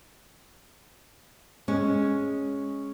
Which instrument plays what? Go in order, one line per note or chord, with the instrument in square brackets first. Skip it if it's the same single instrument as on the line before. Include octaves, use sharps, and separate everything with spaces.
[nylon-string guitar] G#3 C#4